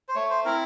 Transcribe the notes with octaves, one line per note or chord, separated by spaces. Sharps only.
C5
A3 C#5
C5
C4 E4 A#4